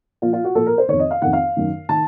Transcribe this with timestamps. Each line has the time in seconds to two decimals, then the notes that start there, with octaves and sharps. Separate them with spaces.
0.22 A#2 F3 F4
0.33 F4
0.44 F#4
0.55 A#2 F3 A4
0.66 A#4
0.78 C5
0.88 F2 D#3 C#5
0.99 D#5
1.11 F5
1.22 F2 D#3 F#5
1.33 F5
1.56 F#2 D#3
1.89 D#3 A5